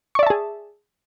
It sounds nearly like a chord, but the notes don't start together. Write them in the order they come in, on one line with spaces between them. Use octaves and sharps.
C#6 D5 E5 A5 G#4